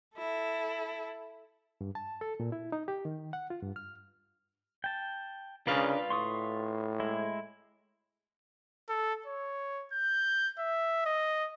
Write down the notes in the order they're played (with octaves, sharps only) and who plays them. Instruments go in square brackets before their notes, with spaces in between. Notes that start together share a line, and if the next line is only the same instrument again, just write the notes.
[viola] E4 A4
[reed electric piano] G2
A5
A4
A#2
E4
D#4
G4
D#3
F#5
F4
G2
F6
[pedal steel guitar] G5 A5
[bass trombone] C#3 [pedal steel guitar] D4 A#4 D5 [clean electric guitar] F4 B4 F5
[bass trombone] A2 [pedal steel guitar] C6 C#6 D#6
[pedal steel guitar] G#3 E4
[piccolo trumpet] A4
C#5
G6
E5
D#5